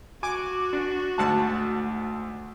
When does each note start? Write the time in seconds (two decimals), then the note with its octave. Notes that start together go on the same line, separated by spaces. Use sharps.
0.23 F#4 G#5 D6
0.73 D4
1.18 D2 G#2 A5